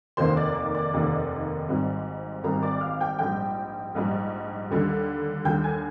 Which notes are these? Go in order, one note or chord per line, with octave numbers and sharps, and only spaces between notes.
F1 D#2 D#3 A#3 C5 C6
D5 D6
D5 D6
D5 D6
F1 D#2 D#3 A#3
G#1 G#2 G3 C4
G#1 G#2 G3 C4 A#4 A#5
D5 D6
F5 F6
G5 G6
A#1 G#2 G3 G5 G6
A#1 G#2 G3
D#2 D3 G3
D#2 D3 G3 G5 G6
G#5 G#6